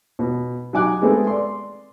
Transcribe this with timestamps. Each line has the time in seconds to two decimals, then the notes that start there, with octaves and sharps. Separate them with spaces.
0.19 B2
0.73 F#3 D#4 G#5 D6 F#6
1.02 G#3 A3 B3 C4 G#4 A4
1.27 D5 C6